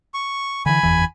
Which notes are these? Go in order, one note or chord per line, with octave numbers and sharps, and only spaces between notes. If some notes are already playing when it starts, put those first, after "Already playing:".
C#6
D3 E3 G#5 B5
F#1 E2 E3